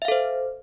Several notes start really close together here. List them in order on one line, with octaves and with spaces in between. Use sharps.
E5 F5 A4 C5